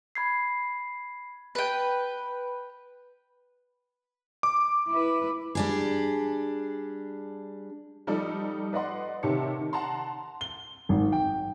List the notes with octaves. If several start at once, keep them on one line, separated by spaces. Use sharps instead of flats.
B5 G#6 C7
B4 G5
D6
E4 B4
G3 D4 G#4
F3 G3 D#4 A4 D5
B4 D5 D#5 F#5 C6
C3 D#3 G4 C#5 A5 C#7
D#3
F#5 A5 A#5 C6
G7
G#1
G5